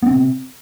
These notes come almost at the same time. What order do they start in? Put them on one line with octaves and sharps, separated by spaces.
B3 C4 C3